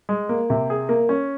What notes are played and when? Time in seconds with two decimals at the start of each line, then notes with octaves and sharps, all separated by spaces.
0.09 G#3
0.29 A#3
0.50 C3
0.70 G#4
0.89 A#3
1.09 C#4